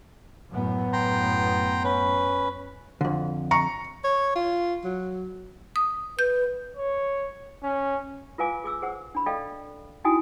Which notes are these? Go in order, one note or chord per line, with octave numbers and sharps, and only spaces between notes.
F#2 A2 B3
G5 A#5 C6
C#4 B4
F2 D3
A#5 C#6 C#7
C#5
F4
F#3
D#6
B4 G6
C#5
C#4
F4 A#4 B4 F5 G#5 D6
G#4 D6 E6
G#4 A#4 C5 F#5
D4 B5
A4 D5 D#5 F5 G5
D#4 E4 F#4 G5 G#5 D#6